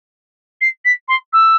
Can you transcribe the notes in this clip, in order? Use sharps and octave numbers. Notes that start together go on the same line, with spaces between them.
C7
B6
C6
E6